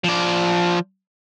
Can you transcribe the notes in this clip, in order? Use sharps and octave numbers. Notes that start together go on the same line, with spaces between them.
F3 D5